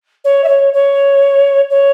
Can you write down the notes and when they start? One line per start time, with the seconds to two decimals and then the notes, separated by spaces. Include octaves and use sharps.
0.24 C#5
0.44 E5
0.48 C#5
0.73 C#5
1.70 C#5